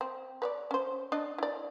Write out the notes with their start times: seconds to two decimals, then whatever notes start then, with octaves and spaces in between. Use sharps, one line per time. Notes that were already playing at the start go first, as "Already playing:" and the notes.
0.01 C4
0.42 B4 C#5 D5
0.71 C#4 C5
1.12 D4 D5 D#5
1.38 E4 D5